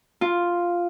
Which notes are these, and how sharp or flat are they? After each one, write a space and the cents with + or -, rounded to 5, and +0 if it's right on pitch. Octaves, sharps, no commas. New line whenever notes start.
F4 +0